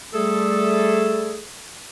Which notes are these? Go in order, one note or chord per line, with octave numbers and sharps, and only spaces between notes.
G3 A3 G#4 A4